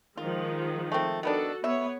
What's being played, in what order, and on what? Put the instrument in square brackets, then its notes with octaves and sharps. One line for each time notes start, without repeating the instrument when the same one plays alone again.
[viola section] D#3 F3 G#3 [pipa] F4
[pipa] A3 C4
[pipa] D#3 B3 D4 [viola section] F#4 A4
[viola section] B3 C#5 [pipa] E5